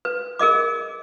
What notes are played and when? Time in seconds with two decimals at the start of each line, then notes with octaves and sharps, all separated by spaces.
0.05 B4
0.39 G#4 A#4 D#5 D6